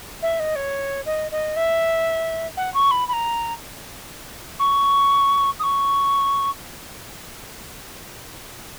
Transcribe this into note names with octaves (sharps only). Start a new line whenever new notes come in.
E5
D#5
C#5
D#5
D#5
E5
F#5
C#6
B5
B5
A#5
C#6
D#6
C#6